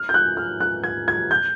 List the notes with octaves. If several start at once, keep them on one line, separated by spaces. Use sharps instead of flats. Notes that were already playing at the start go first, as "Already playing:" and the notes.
Already playing: F6
G6
F#6
F6
F#6
G#6
G#6
G6